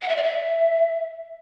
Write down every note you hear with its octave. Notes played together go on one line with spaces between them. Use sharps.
F#5
E5
D5
E5